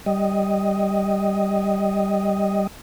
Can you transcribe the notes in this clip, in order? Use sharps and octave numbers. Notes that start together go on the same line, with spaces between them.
G3 D#5